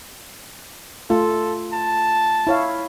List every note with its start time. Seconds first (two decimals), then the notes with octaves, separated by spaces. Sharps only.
1.10 A3 F4 A4
1.73 A5
2.47 E4 C#5 F5